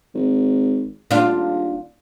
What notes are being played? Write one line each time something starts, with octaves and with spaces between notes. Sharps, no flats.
G#1
D#1 D4 F4